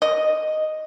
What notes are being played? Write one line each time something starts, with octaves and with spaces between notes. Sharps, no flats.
D#5